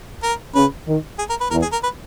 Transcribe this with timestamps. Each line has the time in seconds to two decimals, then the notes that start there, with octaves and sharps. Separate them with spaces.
0.23 A#4
0.55 C#3 B4
0.87 D#3
1.19 G#4
1.30 A#4
1.41 B4
1.51 E2 A#4
1.62 G#4
1.72 A#4
1.83 B4